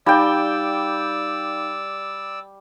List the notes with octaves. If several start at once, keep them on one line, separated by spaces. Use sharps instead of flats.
G3 D#4 D5 F5 G5 E6